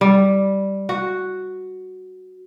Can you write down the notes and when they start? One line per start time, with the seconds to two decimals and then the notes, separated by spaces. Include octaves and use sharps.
0.01 G3
0.89 F#4